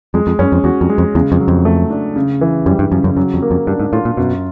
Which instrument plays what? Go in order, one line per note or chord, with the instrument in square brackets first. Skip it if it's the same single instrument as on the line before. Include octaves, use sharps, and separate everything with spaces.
[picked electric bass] F2 [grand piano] G#3
[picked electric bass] F2
[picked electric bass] F#2 [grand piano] C#4
[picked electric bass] F2
[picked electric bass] E2 [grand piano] F#4
[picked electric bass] F2
[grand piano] G#3
[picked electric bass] F2
[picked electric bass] E2 [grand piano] C#3
[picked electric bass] F2
[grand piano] F#3
[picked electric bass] F2
[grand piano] A3
D4
C#3
E3
[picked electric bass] F#2 [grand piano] G3
[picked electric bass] G2
[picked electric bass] F#2 [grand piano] C#3
[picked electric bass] F#2
[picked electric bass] F#2 [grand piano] F#3
[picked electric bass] F2
[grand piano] A#3
[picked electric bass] F2
[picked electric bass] G2 [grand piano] D4
[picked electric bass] G#2
[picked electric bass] A2 [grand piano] F4
[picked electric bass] A#2
[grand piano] F#2 [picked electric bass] B2